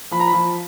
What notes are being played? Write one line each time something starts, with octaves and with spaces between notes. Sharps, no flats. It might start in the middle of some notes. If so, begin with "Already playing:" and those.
F3 B5
A#5
B5
F3